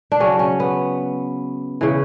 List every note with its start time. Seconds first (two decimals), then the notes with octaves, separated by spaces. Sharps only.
0.12 D4
0.20 C#3 F#3 C#4
0.39 C#4
0.60 B3
1.81 C#3 E3